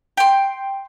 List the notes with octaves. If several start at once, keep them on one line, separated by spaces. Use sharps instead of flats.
G5 C6